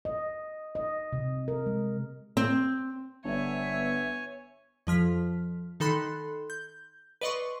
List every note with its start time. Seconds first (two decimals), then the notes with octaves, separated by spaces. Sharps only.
0.05 D#5
0.75 D#5
1.13 C3
1.48 A#4
1.66 G#3
2.37 C4
3.25 G1 B3 C#5 E5 G#5
4.87 F2 F3 F6 B6
5.80 D#3 D#4 A4 B5 C6 F#6
6.50 G6
7.21 B4 D5 D#5 C6 C#6